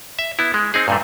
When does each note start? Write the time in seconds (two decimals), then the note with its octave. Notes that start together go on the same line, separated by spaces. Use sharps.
0.19 E5
0.39 B3 E4
0.54 G#3
0.74 C4 D#4 G#4
0.88 G2 A#2 A3